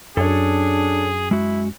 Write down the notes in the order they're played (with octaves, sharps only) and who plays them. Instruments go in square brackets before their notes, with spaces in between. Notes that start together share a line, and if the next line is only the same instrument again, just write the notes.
[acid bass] F#2 [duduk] D4 [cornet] G#4 [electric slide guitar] A4 C#5
[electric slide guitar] G#3 F#4 [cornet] E4